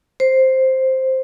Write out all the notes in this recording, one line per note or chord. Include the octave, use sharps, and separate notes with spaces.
C5